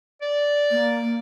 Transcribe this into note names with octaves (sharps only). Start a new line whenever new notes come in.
D5
A#3